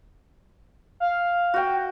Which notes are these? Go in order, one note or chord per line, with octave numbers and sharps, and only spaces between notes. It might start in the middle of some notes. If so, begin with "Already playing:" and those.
F5
F#4 G5